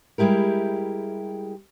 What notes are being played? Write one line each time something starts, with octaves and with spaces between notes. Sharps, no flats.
G3 G#3 E4 G4 A#4